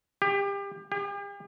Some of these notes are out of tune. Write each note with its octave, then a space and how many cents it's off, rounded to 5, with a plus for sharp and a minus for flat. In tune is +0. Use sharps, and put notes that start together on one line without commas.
G4 +30
G4 +45